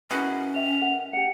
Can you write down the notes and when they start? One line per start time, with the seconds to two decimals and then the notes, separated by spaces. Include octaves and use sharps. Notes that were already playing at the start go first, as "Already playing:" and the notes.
0.11 B2 C#4 E4 F#4 G#4 A#4
0.55 D#5 E5 G5 F7
0.82 A#4 F#5
1.13 G4 F#5 C#7